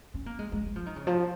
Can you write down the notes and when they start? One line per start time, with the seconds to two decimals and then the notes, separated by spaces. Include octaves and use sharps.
0.14 C#4
0.26 A#3
0.39 G#3
0.52 G#3
0.66 G#3
0.76 F3
0.86 D#3
0.96 C#3
1.07 F3